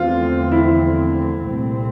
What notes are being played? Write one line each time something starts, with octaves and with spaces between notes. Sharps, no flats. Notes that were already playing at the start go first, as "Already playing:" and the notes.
Already playing: E2 D3 F3 A3 C4 F4
E4
C2 A#2 A3 C4